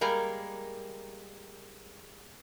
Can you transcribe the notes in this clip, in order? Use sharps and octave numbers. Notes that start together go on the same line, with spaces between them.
G3 G#3 A#3 A#4